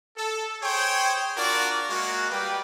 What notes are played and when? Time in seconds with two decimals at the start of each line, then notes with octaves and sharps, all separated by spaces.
0.16 A4
0.62 G#4 C5 C#5 G5
1.36 D4 F4 F#4 A#4 D5
1.88 G#3 A#3 F#4
2.29 G3 A#3 B4 D5 G5